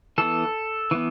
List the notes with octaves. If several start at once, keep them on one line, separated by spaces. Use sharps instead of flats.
E3 B3 A4
E3 B3